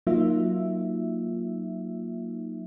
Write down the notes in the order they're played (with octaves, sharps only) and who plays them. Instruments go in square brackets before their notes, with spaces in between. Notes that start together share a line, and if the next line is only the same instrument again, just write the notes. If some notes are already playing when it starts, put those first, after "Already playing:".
[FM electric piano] F#3 A#3 D#4 F4 E5